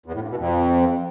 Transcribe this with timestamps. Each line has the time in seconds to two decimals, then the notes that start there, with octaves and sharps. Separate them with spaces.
0.06 E2
0.14 A2
0.22 G2
0.30 B2
0.38 F2